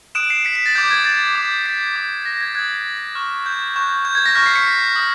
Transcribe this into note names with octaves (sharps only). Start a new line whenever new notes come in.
D#6 F#6 D7 E7
C7 D7
B6 C#7
B6
A6
D6 G6
G#6
A6
D6 G6
B6
D6 G6
A#6
G#6
D#6 F#6 G#6
C#6 F6
G6
C#6 F#6 G6
G6
G#6
A#6
C#6 F6 B6
C7
B6 C#7
D#6 G6